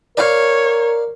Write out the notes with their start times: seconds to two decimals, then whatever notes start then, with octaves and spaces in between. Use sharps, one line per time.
0.17 A#4 C#5 D5 F5